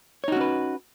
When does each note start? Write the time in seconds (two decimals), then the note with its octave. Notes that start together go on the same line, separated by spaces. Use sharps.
0.24 C#5
0.28 D#4
0.32 F#4
0.36 C#4
0.41 B4